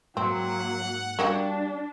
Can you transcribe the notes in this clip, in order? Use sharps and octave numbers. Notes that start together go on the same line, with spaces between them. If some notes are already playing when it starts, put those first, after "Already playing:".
G#2 F#3 A#3 C4 F#5
G3 A#3 D4 F#4 G4